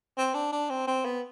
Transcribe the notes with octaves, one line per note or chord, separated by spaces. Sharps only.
C4
D4
D4
C4
C4
B3